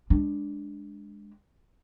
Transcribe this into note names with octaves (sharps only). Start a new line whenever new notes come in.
G#3 D4